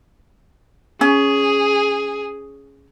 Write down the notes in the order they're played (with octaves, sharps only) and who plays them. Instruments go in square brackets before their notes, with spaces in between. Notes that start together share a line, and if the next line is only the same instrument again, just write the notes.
[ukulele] C#4 [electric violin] G#4